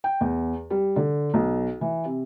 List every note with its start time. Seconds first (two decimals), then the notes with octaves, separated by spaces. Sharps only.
0.04 G5
0.21 E2
0.70 G3
0.96 D3
1.34 B1
1.81 E3
2.05 C3